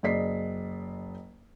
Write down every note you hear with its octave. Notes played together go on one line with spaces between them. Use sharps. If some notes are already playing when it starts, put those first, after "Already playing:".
F#1 G#4 D5 D#5 B6 C7